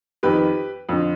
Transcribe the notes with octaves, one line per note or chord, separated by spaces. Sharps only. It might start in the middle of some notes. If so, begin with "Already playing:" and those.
F2 D#3 G4 B4
F2 D3